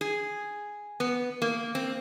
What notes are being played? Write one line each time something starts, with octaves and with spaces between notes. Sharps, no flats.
G#4
B3
A#3
C4